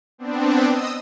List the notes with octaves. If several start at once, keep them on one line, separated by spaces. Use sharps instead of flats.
B3 C4 D4
D#5 D#6 E6